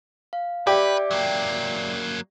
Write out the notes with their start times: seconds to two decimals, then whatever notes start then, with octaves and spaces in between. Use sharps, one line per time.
0.33 F5
0.67 G4 B4 D5 E5 G5
1.11 F#3 A#3